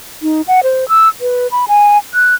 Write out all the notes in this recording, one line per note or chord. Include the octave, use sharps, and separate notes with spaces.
D#4
F#5
C5
E6
B4
B5
G#5
F#6